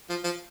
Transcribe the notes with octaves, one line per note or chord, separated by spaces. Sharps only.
F3
F3